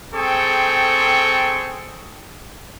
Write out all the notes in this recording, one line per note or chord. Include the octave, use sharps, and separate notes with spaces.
C4 G#4 A4 G5 C#6